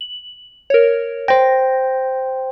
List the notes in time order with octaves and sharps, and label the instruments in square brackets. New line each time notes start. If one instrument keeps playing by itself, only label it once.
[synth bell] F#7
A#4 C#5
[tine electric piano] C5 G5 [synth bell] A#6